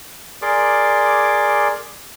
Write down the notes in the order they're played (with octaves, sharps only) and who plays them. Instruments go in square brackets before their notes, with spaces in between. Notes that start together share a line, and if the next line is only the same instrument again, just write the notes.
[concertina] G#4 A#4 D5 C6 D6